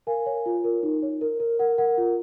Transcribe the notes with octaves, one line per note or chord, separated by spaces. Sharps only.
A#4 F5 G#5
C#5
F4
A#4
D#4
C#5
A#4
A#4
A#4 F#5
A#4 F#5
F4